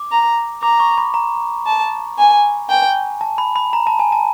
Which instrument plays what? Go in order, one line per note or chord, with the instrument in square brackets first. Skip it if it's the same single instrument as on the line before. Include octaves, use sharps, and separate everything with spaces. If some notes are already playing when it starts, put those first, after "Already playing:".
Already playing: [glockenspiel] D6
[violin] A#5
[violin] A#5 [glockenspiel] D6
[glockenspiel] C#6
B5
A#5
[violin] A5
G#5
[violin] G5 [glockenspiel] G#5
[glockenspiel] A5
B5
B5
A#5
A5
G#5
A5